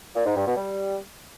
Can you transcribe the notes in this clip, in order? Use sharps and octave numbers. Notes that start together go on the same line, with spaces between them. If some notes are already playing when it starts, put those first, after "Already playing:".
A#2
G#2
G2
B2
G3